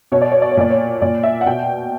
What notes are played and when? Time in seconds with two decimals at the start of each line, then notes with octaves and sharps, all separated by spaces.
0.12 B2 C#5
0.22 D5
0.32 C#5
0.42 D5
0.51 C#5
0.57 A#2 D5
0.70 C#5
1.02 A#2 D5
1.23 E5
1.41 F#5
1.46 B2 G5